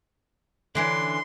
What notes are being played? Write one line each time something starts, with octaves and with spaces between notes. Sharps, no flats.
D3 E3 C#4 C6